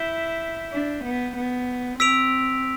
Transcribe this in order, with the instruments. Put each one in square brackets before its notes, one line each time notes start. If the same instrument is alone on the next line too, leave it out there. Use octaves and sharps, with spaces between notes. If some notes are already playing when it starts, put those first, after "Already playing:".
Already playing: [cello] E4 [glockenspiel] G6 B6 E7 G7
[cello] D4
B3
B3
[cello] C4 [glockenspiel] E6 B6 D7 F7